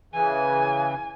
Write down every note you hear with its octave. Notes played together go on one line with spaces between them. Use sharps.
C#3 E3 G#5